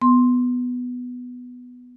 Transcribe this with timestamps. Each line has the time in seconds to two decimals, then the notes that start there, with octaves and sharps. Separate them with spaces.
0.02 B3 C6